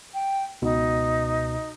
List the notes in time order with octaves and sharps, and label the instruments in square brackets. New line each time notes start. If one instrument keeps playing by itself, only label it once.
[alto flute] G5
[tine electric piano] C#2 B2 [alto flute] D#4